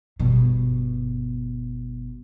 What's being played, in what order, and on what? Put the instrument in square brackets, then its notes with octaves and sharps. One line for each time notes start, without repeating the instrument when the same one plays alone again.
[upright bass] G1 B2